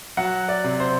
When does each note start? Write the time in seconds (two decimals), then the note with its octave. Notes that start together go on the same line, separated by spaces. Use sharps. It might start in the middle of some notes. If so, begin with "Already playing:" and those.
0.17 F#3 F#5
0.48 D5
0.64 C3
0.80 C5